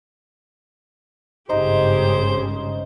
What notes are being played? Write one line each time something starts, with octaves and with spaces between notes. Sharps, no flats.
G#1 G2 C#3 D#4 G4 G#4 C5 A#5